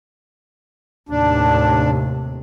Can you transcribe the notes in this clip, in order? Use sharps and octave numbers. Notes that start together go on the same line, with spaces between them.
D#2 A2 C3 D4